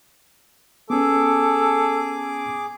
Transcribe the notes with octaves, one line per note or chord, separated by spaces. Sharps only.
B3 C#4 G#4 A4 D6